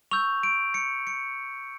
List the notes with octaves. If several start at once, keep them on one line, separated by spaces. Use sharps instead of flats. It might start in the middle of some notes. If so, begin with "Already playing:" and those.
C#6 E6 G6 F7
D7
C#7
C#7